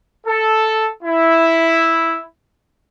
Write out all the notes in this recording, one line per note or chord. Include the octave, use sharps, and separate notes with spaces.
A4
E4